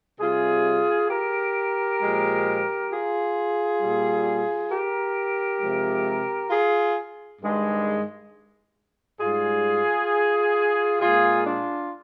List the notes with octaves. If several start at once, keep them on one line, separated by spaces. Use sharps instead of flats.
C3 G3 F4 G#4
G4 A#4
A#2 F3 G#3
F4 G#4
A#2 G3
G4 A#4
C3 F3 G#3
F4 G#4
G2 D#3 G#3
G#2 G3 F4 G#4
A#2 G#3 F4 G#4
D4 F4